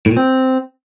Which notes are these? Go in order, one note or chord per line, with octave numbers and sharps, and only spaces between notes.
A2
A#2
C4